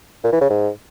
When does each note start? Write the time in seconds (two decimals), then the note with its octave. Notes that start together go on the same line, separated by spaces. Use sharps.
0.24 A#2
0.33 E3
0.41 C#3
0.50 G#2